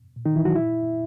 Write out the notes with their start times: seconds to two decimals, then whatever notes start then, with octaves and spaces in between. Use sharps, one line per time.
0.16 A#2
0.26 D#3 D#4
0.36 E3 E4
0.45 F#3 F#4
0.56 A#2 E4 E5